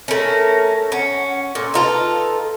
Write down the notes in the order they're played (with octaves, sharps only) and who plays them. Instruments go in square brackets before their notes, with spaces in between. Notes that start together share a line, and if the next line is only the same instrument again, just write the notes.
[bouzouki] A3 C#4 [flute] A#4
[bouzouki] C#4 [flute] F#5
[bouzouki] A#2 [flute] A4
[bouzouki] D#4 F4 A4 [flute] B4